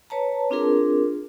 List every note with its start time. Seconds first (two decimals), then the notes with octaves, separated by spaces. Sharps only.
0.10 B4 C#5 A5 A#5
0.50 C4 D4 F4 G#4 A#4